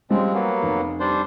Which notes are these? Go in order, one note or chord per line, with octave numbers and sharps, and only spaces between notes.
F3 G3 G#3 C4 C#4
F#3 A#3 B3
F1
G3 D4 C5